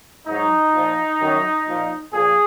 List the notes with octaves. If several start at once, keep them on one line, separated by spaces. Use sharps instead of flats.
G#2 F#3 D#4
A#2 F3
F#2 D#3 F#3
A#2 F3
A#2 F3 G#4